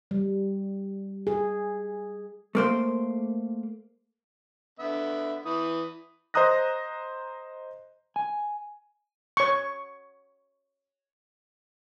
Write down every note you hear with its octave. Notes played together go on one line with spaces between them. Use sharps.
G3
G#4
A3 A#3 C5
D3 B3 E5
E3 D#6
C5 D#5 A#5 D#6 F#6 A#6
G#5
C#5 C#6